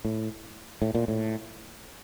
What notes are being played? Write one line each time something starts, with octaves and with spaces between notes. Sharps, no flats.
A2
A2
A#2
A2